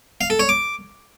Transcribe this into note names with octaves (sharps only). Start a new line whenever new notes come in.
F5
A4
C#5
D6